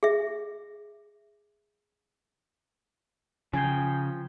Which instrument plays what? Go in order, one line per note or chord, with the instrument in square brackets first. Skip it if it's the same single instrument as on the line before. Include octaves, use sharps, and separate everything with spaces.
[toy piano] G#4 E5
[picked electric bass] C#3 [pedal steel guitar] F3 G5 [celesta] G#5 G#6 C7